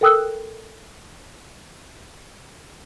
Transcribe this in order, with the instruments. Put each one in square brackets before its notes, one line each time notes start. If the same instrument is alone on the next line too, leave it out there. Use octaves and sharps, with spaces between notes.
[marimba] A4 A#4 G5 D#6 E6 F#6